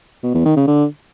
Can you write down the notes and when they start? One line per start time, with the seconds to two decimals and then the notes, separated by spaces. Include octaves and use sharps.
0.23 B2
0.34 E2
0.45 D#3
0.56 C#3
0.67 D3